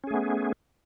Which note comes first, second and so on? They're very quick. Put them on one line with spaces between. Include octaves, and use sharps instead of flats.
C#4 G#4 A3 B3